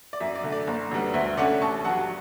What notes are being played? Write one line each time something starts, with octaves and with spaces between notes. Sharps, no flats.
D5
F#2 E5
D5
D3 A3
D5
F#1
F#2 D3 G3 B3
D2 E5
D3 A3 C#4 D5 F#5
A1 A5 C#6
G2 F#3 F#5 A5